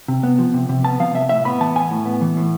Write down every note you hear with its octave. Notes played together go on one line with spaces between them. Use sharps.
C3
B3
F3
C3
C3
B3 A5
F3 F5
C3 E5
A2 E5
B3 B5
E3 A5
A2 G#5
A2
B3
E3
A2